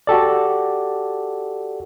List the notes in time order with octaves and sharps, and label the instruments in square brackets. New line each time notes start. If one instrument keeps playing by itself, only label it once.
[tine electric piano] F#4 G4 A4 D5